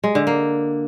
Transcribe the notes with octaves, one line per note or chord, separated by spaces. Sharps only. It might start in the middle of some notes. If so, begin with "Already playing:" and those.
G#3
D3
A#3